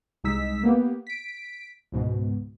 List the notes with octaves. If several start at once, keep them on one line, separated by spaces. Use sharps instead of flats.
C2 G#3 D#4 E6 B6
A#3 B3 G4
B6 D7
C#2 G#2 B2